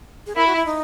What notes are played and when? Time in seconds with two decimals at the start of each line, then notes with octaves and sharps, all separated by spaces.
0.27 G#4
0.35 E4 A#4
0.47 F#4
0.56 E4
0.66 D#4